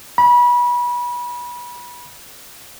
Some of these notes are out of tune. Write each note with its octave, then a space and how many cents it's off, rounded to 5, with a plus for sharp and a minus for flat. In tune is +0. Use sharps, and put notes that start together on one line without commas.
B5 -30